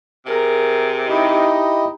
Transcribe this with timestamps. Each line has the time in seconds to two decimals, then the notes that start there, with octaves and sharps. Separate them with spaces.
0.26 C3 G#4 A#4
1.08 D#4 E4 G4 D#5